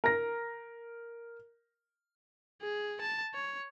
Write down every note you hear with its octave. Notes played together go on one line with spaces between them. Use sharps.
A#4 A#6
G#4
A5
C#5